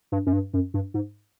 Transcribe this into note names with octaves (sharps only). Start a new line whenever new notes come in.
G2
F#2
G2
F#2
G2
G#2